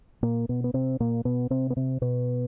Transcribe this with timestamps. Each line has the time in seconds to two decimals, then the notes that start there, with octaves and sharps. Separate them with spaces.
0.22 A#2 A#3
0.49 B2 B3
0.64 B3
0.74 C3 C4
1.00 A#2 A#3
1.25 B2 B3
1.50 C3 C4
1.70 B3
1.76 C3 C4
2.01 B2 B3